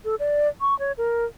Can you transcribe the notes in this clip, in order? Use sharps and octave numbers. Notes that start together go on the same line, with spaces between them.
A4
D5
C#6
C#5
A#4